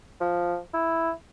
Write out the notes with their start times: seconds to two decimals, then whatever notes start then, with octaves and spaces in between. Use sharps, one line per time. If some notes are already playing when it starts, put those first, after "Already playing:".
0.21 F3
0.74 E4